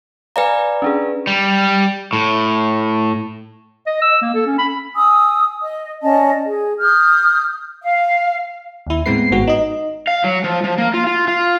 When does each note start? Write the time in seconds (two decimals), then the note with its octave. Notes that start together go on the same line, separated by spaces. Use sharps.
0.36 B4 D5 F5 G#5 A#5
0.82 C#4 D4 G#4
1.27 G3
2.13 A2
3.87 D#5
4.02 E6
4.22 A#3
4.35 A4
4.47 C#4
4.59 B5
4.95 G#5 D#6 E6
5.61 D#5
6.02 C#4 D5 D#5 A5
6.44 G#4
6.80 D#6 F6 G6
7.82 F5
8.87 D#2 E4
9.06 A2 G#3 B3 C4 B4 C7
9.31 G#1 G#2 B3 F#4
9.47 D#4 D#5
10.07 F5
10.24 F#3
10.44 F3
10.64 F3
10.78 A#3
10.94 F4
11.07 F4
11.28 F4